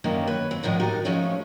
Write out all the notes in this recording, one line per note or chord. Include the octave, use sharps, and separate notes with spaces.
F#2 D3 D#3 A#3 C#4 E4
B4 C#5
C4
A2 D#3 F3 B3 A#4
D#4 F#4 G4 A4 A#4
C#3 F3 G#3 A3 C#4 D#4